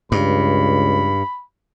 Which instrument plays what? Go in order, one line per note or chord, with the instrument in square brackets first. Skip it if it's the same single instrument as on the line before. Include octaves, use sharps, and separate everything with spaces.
[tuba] C#2 [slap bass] G2 [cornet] B5